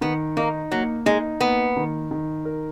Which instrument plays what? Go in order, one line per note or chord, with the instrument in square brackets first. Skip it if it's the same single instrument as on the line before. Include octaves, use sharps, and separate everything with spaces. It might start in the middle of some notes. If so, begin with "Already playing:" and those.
[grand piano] D#3 [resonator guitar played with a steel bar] B3
[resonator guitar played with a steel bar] A#3 [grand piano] D#4
[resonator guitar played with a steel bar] F#3 [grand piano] A#3
[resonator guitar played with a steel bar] G#3 [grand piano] D#4
[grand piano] A#3 [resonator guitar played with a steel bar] B3
[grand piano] D#3
D#3
A#4